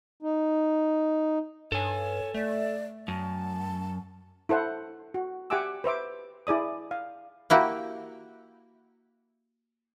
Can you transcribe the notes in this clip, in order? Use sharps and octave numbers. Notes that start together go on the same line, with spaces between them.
D#4
G2 A4 C#5 G#5
A3 D5
F#2 A5
E4 A4 C5 F#5
F#4
G4 E5 F#5 G#5 D6 E6
B4 C5 E5 D6
E4 G#4 D5 D#6
F5
A#3 E4 F#4 G4